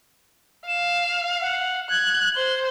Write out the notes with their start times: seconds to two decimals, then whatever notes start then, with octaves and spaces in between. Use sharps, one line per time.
0.68 F5 E7
1.41 F#5
1.90 F#6 G#6
2.36 C5 G7